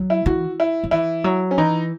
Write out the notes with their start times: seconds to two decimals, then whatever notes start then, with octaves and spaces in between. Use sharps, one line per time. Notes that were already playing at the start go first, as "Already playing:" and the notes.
Already playing: F#3
0.10 E4
0.26 E3 F#4
0.60 E4
0.84 F#3
0.91 E3 E4
1.24 F#3
1.51 C#4
1.58 E3 D#4